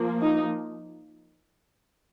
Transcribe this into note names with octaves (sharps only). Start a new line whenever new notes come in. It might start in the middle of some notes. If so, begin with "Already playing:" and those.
Already playing: F3 A#3
D#4